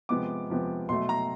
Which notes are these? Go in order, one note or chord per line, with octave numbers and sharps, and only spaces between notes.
C3 F3 G#3 B3 D6
C3 F3 G#3 B3
B2 F#3 A3 C6
A#5